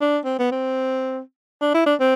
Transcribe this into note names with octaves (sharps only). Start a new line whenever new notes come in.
D4
C4
B3
C4
D4
E4
D4
C4